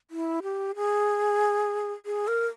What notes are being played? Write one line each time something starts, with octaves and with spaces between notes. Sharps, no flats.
E4
G4
G#4
G#4
A#4